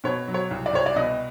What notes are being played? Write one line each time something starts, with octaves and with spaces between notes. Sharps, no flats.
B2 C#5
F#3
C#5
C2
D5
C2 C#5
D5
B2 D#5